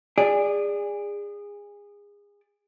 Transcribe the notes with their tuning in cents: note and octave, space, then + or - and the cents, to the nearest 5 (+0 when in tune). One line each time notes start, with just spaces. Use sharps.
G#4 -25 D5 +0